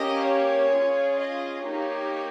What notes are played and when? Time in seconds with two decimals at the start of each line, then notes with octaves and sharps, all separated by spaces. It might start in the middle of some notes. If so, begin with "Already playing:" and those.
Already playing: A#3 C#4 G4 D#5
0.26 C#5
0.73 C#4 F4 G#4
1.19 D#5
1.65 A#3 D#4 G4 C#5